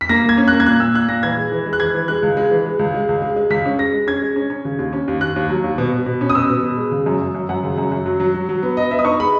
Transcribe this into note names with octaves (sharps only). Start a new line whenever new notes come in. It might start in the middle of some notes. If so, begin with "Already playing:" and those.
B6
A#3 A#6
A#3 G#6
C#4
A#3 F#6
G#6
A#2 F#6
A#2 E6
A#2 F#6
A#2 A#6
E3 G#6
G#3
E3
G#3
F#6
E3 G#6
E3
G#3 F#6
C#2
G#3
E3
G#3
C#2
G#3
C#2
G#3
G#3
C#2 B6
C#4
G#3 A#6
G#3
C#4 G#6
G#3
C#4
C#4
C#3
D#2
C#4
D#2
D#2 F#6
D#2
F#3
D#2
B2
B2
B2
C#4
D#6
B2 E6
B2
B2
G#3
C#3
F#2
F#2
F#2
F#2 F#5
C#3
F#2
F#2
F#3
F#3
F#3
F#3
B3
B3 D#5
B3 E5
D#6
D#4 C#6
G#3 B5